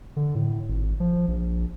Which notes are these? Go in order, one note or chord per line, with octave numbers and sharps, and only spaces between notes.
D3
A2
G#1
F3
A#1